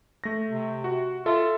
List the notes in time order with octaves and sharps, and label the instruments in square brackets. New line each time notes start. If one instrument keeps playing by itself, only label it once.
[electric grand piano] A3 A#6
[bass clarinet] C3
[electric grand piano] F#4
[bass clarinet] F4 [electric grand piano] A4 E5